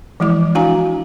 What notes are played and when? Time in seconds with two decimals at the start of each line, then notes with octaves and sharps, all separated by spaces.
0.20 E3 F3 G#3 E4 D6
0.55 D4 E4 F#4 F5 G#5 A#5